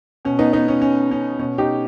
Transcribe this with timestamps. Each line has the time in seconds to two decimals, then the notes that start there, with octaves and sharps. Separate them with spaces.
0.25 B2 C#4
0.39 B3 D#4
0.53 B3 D#4
0.68 C#4
0.82 C#4
1.11 C#4
1.39 B2 C#4
1.58 D#4 G4